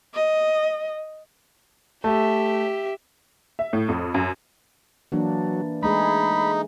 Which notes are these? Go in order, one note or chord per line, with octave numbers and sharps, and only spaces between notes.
D#5
A3 G4 E5
E5
A2
F2
F#2
E3 F#3 A#3 D4
G#3 A3 D#4 G#4 B5